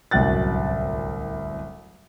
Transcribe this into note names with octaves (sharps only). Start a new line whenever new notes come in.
D1 C2 F#2 G5 F#6 A6